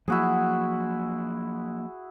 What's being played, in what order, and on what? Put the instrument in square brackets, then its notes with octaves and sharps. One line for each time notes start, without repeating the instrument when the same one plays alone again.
[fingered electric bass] F3 F#3 A#3 [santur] E4 F#4 G#4